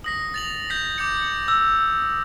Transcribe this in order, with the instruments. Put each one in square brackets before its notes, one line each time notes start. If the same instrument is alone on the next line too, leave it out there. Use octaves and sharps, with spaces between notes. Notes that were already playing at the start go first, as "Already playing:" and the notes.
[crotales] D#6 A#6 B6
A6 F7 F#7
G6 A#6 B6
D6 G6 C#7
[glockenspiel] E6